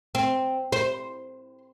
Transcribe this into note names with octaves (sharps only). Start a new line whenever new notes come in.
C4
C5